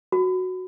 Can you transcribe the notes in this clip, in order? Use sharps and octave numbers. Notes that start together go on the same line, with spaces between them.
F#4